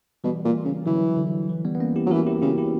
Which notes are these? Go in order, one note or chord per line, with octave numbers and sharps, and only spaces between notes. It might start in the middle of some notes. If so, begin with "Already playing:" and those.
B2 E3 G3
A#2
C#3
D3 E3 F#3
D3
E3
G3 B3
B3
A#3 C#4
E4 G4
F#3
E3 F#4 A#4
E4 G4
C#3 E4 G4
E4 G4